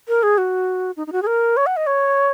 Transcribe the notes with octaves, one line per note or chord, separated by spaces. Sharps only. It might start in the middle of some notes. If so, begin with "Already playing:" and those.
A#4
G#4
F#4
D#4
D#4
F#4
G#4
A#4
C#5
F#5
D#5
C#5